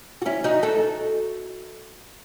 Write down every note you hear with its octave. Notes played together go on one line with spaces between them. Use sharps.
F#4
C#4 E4
D#4 F#4
F#4 A4